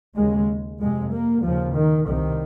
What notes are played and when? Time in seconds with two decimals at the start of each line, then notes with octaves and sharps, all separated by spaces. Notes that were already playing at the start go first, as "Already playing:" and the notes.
0.17 D#2 C#3 G#3
0.80 F2 C3 G#3
1.12 A#3
1.44 D#2 C#3 F3
1.76 D#3
2.08 C2 C3 D#3